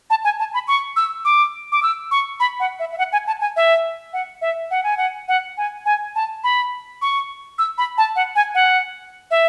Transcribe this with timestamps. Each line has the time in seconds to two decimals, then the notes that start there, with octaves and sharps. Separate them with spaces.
0.10 A5
0.24 G#5
0.39 A5
0.54 B5
0.68 C#6
0.96 E6
1.25 D6
1.72 D6
1.83 E6
2.11 C#6
2.40 B5
2.60 F#5
2.79 E5
2.92 E5
2.98 F#5
3.13 G#5
3.27 A5
3.41 G#5
3.56 E5
4.13 F#5
4.41 E5
4.71 F#5
4.84 G#5
4.97 F#5
5.28 F#5
5.57 G#5
5.85 G#5
6.15 A5
6.44 B5
7.02 C#6
7.59 E6
7.78 B5
7.98 A5
8.16 F#5
8.35 G#5
8.55 F#5
9.31 E5